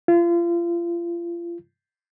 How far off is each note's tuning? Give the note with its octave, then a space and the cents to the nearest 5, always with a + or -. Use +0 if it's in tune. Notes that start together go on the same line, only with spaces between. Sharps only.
F4 -35